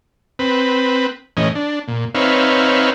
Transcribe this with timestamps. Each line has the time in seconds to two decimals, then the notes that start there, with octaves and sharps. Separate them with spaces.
0.39 C4 B4
1.37 A2 E3 C#4 D#5
1.55 D4
1.88 A#2
2.15 C4 D#4 B4 C#5 E5 F5